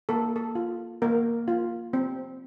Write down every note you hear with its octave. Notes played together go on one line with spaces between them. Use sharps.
A#3 A4
A4
F4
A#3 A#4
F4
C4